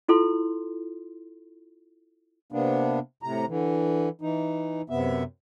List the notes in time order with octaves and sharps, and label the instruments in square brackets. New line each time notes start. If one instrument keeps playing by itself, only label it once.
[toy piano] E4 F4 A4 C6
[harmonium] C3 A#3 B3 D4
A2 C3 A#5
D3 E3
E3 D#4
F#2 C3 B3 E5